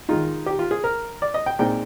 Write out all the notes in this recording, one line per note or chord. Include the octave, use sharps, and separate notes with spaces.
D#3 G#3 D#4 F4
G4
F4
G#4
A#4
D5
D#5
G5
A#2 G#3 C4 D#4 G5